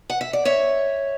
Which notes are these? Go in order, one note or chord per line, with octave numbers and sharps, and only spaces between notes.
F#5
E5
D5
C#5 E5